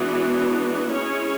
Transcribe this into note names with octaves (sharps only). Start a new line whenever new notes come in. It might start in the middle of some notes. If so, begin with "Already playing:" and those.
Already playing: E3 G#3 B3 D4 F#4
G#3 C#4 E4 G#4 C#5